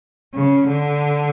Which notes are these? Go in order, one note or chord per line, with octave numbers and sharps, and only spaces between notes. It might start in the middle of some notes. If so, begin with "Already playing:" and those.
C#3
D3